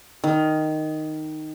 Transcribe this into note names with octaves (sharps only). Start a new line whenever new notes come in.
D#3